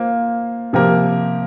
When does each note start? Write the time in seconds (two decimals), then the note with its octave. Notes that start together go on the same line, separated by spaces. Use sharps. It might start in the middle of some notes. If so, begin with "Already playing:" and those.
Already playing: A#3 F4 C5
0.73 C3 F3 A#3 G4 A#4